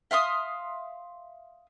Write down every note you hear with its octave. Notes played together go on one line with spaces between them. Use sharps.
E5 F5 C6 D#6